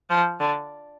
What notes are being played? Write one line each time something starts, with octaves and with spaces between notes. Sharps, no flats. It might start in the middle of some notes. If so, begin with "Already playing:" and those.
F3
D3